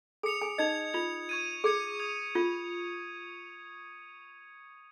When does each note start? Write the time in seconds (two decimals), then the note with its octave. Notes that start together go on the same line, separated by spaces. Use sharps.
0.23 G#4 G#5 D#6 C#7 F7
0.42 G#4 G#5
0.58 D#4 D#5 G#6 C#7 F7
0.94 F4 G#6 F7
1.29 C#6 G#6 D#7
1.64 G#4 C#6 G#6 C#7 F7
2.00 D#6 G#6 F7
2.35 F4 G#6